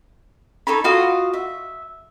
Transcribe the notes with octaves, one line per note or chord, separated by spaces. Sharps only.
D#4 A4 C#5 B5
F4 F#4 D#5 F5
E5